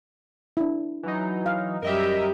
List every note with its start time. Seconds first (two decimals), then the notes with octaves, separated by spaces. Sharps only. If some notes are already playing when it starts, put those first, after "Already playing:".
0.57 D4 E4
1.03 E3 F#3 D#4
1.46 F5
1.82 F#2 G3 G4 A#4 D#5 E5